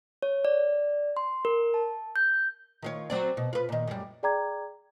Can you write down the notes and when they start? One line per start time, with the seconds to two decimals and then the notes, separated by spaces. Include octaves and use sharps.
0.22 C#5
0.45 D5
1.17 C6
1.45 A#4
1.74 A5
2.16 G6
2.82 D#3 F4 C#5
3.10 F#3 C4 D5
3.37 B2
3.53 F4 B4
3.69 A#2 D#3
3.87 F#2 G3
4.23 G#4 D5 G5 A#5 D6 G#6